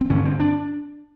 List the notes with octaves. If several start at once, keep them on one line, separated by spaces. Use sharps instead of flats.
C4
G2 D3 C#4
C4
D4